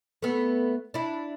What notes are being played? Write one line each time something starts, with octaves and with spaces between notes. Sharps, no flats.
A3 B3
D4 E4